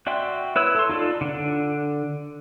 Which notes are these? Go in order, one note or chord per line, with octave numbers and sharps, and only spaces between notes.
F#4 D5 E5 G5 C6
E4 B4 C#5 E6
A4 C6
D#4 F4 A4 D5
D3 D4